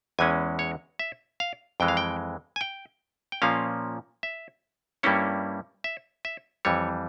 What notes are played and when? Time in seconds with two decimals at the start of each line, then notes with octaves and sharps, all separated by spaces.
0.19 E2 E3 G#3 C#4 G#5
0.59 C#5
0.99 E5
1.40 F5
1.80 F2 E3 G#3 G5
1.88 F5
1.97 G5
2.56 G#5
2.61 G5
3.32 G5
3.42 A#2 F3 A#3 C#4 F5
4.23 E5
5.03 G2 G3 A#3 C#4 E4 C#5
5.84 E5
6.25 E5
6.65 F2 E3 G3 C#5